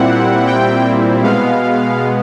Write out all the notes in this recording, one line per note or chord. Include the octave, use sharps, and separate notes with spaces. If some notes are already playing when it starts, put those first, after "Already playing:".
Already playing: A#2 G3 C4 E4 F#5
G5
B2 G#3 B3 F5